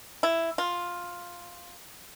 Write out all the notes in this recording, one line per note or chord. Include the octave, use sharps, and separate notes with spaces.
E4
F4